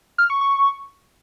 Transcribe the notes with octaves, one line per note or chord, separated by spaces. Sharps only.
F6
C#6
C#6